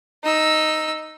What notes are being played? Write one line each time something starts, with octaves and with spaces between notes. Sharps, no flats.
D#4 E6